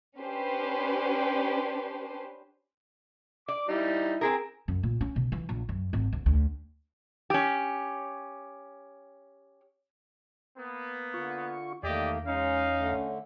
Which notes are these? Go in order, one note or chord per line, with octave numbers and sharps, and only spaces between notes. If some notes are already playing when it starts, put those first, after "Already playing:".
C#4 D4 G4 B4 C5
D5 D6
G3 D#4 E4
C4 G#4 A#4
F#2
A#2
C#4
B2
E3
A#1
F#2
G#1
D2
D2
C#4 G4
A#3 B3
D3 F4 C#6
E2 D#3 A3 A#3 G4 D5 D#5
G#3 C#4 D#4 F5
D3 A3